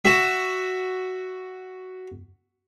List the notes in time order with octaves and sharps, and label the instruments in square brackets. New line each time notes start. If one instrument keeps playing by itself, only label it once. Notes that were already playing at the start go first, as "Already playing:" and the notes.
[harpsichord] F#4 E5